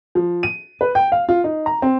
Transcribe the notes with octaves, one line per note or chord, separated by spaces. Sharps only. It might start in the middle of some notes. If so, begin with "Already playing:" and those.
F3
D#7
B4
G5
F5
F4
D#4
A#5
C4